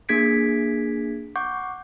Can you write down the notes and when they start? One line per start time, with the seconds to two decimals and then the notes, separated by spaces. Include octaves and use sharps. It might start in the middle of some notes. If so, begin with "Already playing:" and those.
0.09 A#3 D4 G#4 G#6 B6 D7
1.36 F#5 C#6 D6 G6